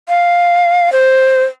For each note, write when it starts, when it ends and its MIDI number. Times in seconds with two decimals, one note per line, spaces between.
0.09 0.92 77
0.93 1.43 72